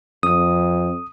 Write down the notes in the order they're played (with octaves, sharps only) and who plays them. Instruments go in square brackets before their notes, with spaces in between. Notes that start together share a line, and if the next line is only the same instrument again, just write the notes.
[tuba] F2 [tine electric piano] D#6